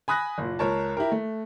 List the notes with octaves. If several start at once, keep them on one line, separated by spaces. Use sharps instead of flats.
G#5 B5 D#6 F#6 A#6
F#1 A#2
C#2 A#4 C#5 A5
E4 G4 A#4
A3